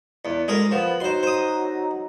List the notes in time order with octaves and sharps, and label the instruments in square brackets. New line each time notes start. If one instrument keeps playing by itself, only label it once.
[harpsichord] E2
[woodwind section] D2 [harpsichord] G#3 G#4 A#4
[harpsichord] F3 [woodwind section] B3
[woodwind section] F#3 D#4 [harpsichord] C5 C6
[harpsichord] C5 D#6